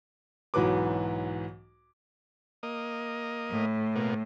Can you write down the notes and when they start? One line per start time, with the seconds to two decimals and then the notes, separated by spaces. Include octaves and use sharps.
0.54 B1 G#2 E3 F#3 B4 D6
2.63 A#3 D#5
3.51 A2
3.95 B2 A#3